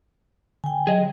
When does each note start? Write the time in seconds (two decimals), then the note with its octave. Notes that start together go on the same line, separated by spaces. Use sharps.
0.64 D3 G5 G#5
0.87 F#3 G#4 D#5